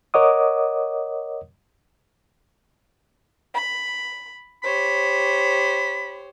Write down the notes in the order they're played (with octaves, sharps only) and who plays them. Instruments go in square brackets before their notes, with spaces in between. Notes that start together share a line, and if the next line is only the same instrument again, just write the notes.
[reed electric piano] A#4 C#5 D#5 F#5 D6 D#6
[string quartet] B5
[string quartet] G4 C5 C#5 [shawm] B5